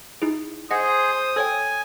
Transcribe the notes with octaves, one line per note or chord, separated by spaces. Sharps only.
D#4 E4 G#4
G#4 C5 D#5 F#5 D#6
A4 C#5 G5 G#5